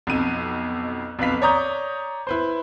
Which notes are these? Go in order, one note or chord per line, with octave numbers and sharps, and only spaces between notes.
B1 F2 D#7
B1 F2 B4 F5 B6
C#5 D5 A#5 D#6 G6
E4 B4 C5